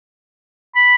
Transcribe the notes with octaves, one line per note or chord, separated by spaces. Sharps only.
B5